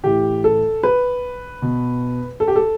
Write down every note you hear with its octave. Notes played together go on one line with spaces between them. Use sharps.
A2 E3 G4
A4
B4
B2
A4
G4
A4